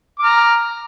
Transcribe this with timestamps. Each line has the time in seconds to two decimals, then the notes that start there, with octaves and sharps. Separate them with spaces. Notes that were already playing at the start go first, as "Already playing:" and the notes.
0.19 D6
0.22 F6
0.25 A#5